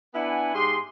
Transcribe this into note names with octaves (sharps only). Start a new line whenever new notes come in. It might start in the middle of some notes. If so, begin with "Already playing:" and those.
B3 D4 E4 F#5 G#5
G#2 G4 G#4 C6